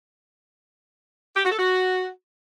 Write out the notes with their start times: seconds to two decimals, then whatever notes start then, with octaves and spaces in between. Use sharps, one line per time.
1.36 G4
1.44 F#4
1.51 A4
1.58 F#4